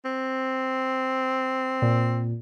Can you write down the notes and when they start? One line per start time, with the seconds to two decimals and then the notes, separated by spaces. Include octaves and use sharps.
0.05 C4
1.82 A#2